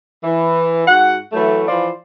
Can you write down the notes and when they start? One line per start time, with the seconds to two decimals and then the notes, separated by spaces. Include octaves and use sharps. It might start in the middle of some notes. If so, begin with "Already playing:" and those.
0.23 E3
0.87 G#2 F#4 F#5
1.32 E3 F#3 A3
1.68 E3 F3 F4 C5 D5